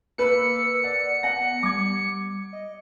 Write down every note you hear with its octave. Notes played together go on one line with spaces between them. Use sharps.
A#3 B4 E6 C#7
D5 F#5
B3 F#5 A#6
G3 D6 G#6
D#5